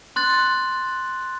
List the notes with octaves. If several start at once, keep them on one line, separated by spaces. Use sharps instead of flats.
C6 F#6 A6